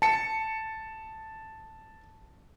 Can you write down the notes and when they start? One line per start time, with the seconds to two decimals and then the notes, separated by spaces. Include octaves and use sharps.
0.02 A5 C#7